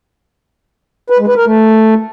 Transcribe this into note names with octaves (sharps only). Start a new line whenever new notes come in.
B4
G#3
B4
A#4
A3